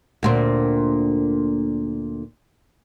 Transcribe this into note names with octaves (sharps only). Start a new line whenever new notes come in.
D2 A#2 C4